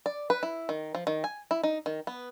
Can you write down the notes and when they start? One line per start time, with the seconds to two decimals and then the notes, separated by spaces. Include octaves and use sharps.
0.06 D5
0.30 B4
0.43 E4
0.69 D#3
0.95 F3
1.07 D#3
1.24 G#5
1.51 E4
1.63 D#4
1.86 D#3
2.07 B3